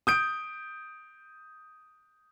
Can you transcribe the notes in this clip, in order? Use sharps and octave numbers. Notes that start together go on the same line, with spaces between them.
D#6 G6 D7